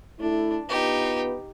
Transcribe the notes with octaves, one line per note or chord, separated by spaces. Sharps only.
A3 D4 E4
B3 D#4 F4 G4 B4